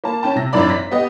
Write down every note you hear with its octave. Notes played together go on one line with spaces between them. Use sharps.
A#3 A5
C#4 G5 A5
C3 A#6
G#1 F#2 E3 D4 D5 B5
A#6 B6
B3 G4 D#5